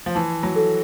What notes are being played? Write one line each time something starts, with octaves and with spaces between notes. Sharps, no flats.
F3
E3 A5
F#3
A4